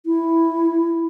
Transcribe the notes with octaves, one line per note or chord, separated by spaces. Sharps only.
E4